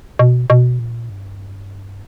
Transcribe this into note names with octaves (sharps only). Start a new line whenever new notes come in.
B2
B2
A#2
G2